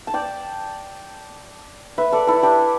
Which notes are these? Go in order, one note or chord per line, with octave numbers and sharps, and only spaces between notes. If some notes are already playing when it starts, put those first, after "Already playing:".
A5
D5 G5
B4 E5
A4 D5
E4 A4
D4 G4